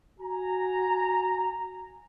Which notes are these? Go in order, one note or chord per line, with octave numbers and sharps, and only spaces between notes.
F#4 G#5 A#5